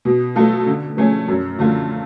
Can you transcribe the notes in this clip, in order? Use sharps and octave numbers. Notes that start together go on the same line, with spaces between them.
B2
F#3 A3 F4 A4
D3
F3 A3 C#4 G#4
F#2
D3 F3 A3 F4